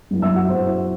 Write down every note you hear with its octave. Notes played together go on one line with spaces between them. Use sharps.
F#2 F#3 B3 E4
E5 E6
F#4 F#5
F#2 F#3 B3 E4 C5